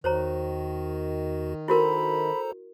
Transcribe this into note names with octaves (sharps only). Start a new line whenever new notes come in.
E2 D#3 F#4 C5 C#5 A#5
E4 F#4 A4 A#4 C5 A#5 B5